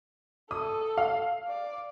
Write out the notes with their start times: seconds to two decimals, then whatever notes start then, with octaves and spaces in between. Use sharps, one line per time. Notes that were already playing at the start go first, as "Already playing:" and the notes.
0.51 A4 D#6
0.98 F5
1.48 D5